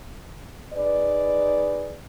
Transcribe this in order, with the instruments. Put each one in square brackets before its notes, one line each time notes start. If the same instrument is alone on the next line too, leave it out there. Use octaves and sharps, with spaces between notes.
[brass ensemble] D#4 G#4 B4 D5